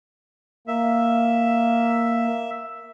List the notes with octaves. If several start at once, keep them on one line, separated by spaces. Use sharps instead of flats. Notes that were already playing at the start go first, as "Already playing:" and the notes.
A#3 E5